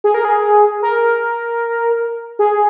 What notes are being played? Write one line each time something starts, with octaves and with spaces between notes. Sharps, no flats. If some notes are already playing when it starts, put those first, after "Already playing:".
G#4
A#4
G#4
A#4
G#4